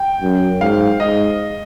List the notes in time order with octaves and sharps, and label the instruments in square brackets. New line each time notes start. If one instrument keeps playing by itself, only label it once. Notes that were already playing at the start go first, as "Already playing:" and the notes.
Already playing: [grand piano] G5
[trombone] F#2
[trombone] G#2 [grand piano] F5
[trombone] G#2 [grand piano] D#5